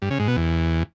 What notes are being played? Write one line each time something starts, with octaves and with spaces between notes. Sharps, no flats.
G2
C#3
G#2
B2
E2